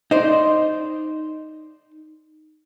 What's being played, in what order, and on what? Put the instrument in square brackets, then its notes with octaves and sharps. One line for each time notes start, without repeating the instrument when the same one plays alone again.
[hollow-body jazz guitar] D#4 C5 D5